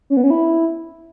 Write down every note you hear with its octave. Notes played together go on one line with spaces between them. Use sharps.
C#4
B3
C#4
E4